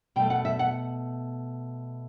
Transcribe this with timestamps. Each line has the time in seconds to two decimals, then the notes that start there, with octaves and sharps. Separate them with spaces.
0.16 B2 G5
0.20 A3
0.30 F#5
0.45 E5
0.59 F#5